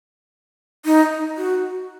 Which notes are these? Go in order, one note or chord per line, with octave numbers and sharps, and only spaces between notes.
D#4
F#4